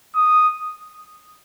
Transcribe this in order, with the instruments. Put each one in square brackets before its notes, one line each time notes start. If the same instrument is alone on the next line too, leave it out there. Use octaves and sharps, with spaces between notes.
[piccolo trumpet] D#6